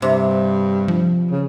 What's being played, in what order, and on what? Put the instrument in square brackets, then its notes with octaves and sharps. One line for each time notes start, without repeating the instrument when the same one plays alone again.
[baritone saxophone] G2 [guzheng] C3
[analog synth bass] F3
[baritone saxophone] C#3